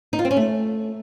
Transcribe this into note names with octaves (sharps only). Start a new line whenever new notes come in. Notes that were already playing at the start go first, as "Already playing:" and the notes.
D#4
F4
C4
C#4
A3